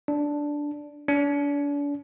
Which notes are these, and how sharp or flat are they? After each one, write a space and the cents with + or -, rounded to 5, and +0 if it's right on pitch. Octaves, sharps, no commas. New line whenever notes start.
D4 -5
D4 -40